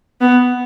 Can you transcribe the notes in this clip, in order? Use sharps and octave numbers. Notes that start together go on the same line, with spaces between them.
B3